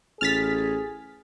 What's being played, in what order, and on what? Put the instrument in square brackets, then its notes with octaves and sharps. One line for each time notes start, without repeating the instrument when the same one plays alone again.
[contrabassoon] A1 [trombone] G#4 [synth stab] F6 A6 B6